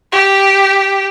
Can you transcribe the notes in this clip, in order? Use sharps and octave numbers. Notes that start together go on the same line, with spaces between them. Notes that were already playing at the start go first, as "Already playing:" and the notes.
G4